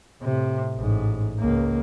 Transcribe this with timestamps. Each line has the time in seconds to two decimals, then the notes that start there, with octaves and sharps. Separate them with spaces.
0.22 A2 C3
0.76 A1 G#2
1.39 C#2 A#3